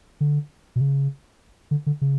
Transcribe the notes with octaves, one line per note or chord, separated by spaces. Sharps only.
D3
B2
C#3
D3
D3
C#3